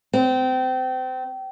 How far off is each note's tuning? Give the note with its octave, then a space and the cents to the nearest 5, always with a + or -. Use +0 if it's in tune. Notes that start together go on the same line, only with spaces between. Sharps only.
C4 -30